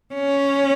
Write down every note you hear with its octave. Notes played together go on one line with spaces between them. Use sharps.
C#4